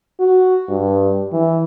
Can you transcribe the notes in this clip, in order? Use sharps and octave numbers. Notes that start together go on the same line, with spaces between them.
F#4
G2
E3